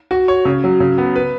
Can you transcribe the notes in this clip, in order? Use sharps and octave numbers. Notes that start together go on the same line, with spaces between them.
F#4
C#5
C#3
F#3
C#3
B3
B4